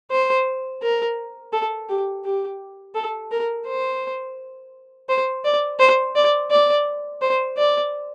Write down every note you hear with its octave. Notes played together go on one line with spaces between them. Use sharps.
C5
A#4
A4
G4
G4
A4
A#4
C5
C5
D5
C5
D5
D5
C5
D5